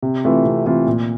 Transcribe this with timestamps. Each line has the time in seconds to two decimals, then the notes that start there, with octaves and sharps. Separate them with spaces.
0.03 C3
0.24 E3 A3 C4 F4
0.45 C3
0.66 E3 A3 C4 F4
0.87 A#2